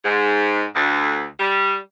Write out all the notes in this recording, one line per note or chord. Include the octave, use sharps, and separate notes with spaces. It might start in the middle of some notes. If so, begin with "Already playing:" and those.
G#2
D2
G3